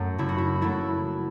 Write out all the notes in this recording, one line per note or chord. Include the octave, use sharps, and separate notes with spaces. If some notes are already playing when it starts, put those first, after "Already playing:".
Already playing: F#2 F#3 A3 F#4
F#1 E4
F#4
E4
F#3 A3 E4